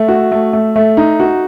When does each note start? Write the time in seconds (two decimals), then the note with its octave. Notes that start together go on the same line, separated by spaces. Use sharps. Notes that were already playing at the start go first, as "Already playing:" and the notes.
Already playing: A3
0.08 F#4
0.32 A3
0.53 A3
0.76 A3
0.97 D#4
1.20 F#4